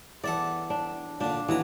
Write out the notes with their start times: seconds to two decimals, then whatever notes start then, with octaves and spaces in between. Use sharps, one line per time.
0.24 E2 A4 D5 E5 F#5
0.70 D4
1.21 A#2 D3 D4
1.49 D#2 E3 F#3 A#5